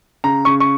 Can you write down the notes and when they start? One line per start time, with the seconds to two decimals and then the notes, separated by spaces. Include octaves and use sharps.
0.24 C#3 A#5
0.45 C#3 C#6
0.60 C#6